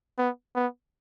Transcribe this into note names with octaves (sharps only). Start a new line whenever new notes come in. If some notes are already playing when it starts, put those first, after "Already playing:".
B3
B3